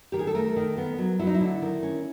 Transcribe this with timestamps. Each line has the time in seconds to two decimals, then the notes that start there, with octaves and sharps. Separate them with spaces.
0.12 D#3 G4
0.19 G#4
0.27 A4
0.35 A3 A#4
0.56 D#3
0.77 B3
0.98 F#3
1.19 F#3 E4
1.27 D#4
1.34 E4
1.41 D3
1.62 D#3
1.83 C#4